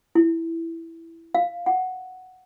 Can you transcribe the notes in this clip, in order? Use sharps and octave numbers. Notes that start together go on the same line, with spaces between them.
E4
F5
F#5